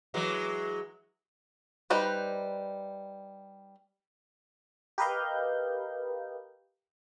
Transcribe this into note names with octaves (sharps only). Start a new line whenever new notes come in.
E3 F#3 G#3
G3 D#4 B4 C5
G4 A#4 B4 D#5 F5 G6